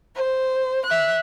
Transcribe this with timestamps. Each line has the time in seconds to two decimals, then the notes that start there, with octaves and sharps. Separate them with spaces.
0.15 C5
0.86 E5 F#6